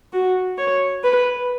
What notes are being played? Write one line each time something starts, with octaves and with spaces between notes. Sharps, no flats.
F#4
C#5
B4